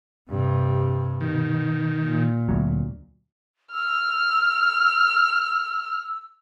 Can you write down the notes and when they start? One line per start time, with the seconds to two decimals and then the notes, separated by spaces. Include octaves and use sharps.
0.30 G2 C3
1.21 B2 D#3
2.03 A#2
2.49 D2 F#3
3.73 E6 F6